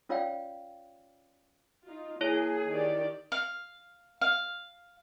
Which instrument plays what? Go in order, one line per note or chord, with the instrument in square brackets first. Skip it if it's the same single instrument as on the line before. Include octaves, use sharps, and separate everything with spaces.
[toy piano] C#4 F4 C#5 D5 F5 G5
[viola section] D#4 F4
[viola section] E3 A#3 [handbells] E4 C#5 [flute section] G#4
[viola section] D#3 G4 D5
[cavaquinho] F5
F5